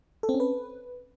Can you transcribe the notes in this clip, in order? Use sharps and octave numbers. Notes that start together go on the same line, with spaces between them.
A4
C4
C#4
B4